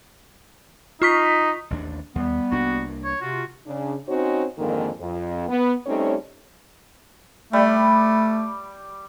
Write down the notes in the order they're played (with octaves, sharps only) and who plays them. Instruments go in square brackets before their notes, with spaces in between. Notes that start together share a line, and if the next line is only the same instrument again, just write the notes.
[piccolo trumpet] D#4 [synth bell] F4 C#6 B6
[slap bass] A1 D#2 D4
[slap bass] D#2 [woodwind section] G3 B3
[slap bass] C2 A#3 D4 [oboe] F#4
[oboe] C#5
[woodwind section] C3 F4 [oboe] F#4
[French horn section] C#3 D4
C4 C#4 D#4 F#4 C5 C#5
F2 G#2 D3 D#3 A#3
F2
B3
G3 A3 C4 C#4 D#4 C#5
[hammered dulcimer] G3 [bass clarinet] A3